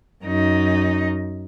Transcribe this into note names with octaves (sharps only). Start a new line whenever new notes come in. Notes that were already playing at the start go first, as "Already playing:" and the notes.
F#2 D#4